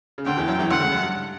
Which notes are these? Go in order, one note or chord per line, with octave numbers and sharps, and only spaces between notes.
C#3
D2 D3 G5
E2 E3
F#2 F#3
E2 E3
D2 D3 F#5
C#2 C#3
F#2
G2